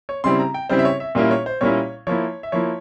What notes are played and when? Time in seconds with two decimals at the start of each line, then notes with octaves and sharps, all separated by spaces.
0.09 C#5
0.24 C#3 G3 C4 E4 C6
0.39 A#5
0.54 G5
0.69 C#3 G3 C4 E4 C5
0.79 E5
0.85 C#5
1.00 E5
1.15 A#2 G3 A#3 C#4 E4 E5
1.31 C#5
1.46 C5
1.61 A#2 G3 A#3 C#4 E4 C#5
2.07 F3 A#3 E4 C#5
2.43 E5
2.52 F3 A#3 E4 C#5